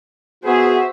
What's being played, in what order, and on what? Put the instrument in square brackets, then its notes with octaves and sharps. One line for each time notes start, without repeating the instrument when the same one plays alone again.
[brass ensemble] B3 G#4 [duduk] F#4 [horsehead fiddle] C5 E5